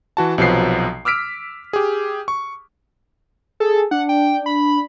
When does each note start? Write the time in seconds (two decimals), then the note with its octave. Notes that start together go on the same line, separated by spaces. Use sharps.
0.17 E3 F#4 A5
0.38 B1 C3 F3 F#3 B4 C7
1.05 D6 E6 F6 B6 D7
1.73 G4 G#4
2.28 C#6
3.60 G#4 A4
3.91 D4 F#5
4.09 G5
4.46 B5